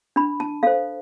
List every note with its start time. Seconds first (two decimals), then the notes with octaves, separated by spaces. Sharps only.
0.16 D4 B5
0.40 A5
0.63 A4 C5 F5